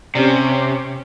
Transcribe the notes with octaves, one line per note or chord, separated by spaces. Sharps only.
C3 C4 C#4 G4 D5